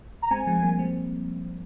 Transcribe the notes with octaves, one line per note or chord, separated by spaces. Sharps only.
A#5
G#3 C4 G#5
F3 G#3
G3 A#3
G#3 C4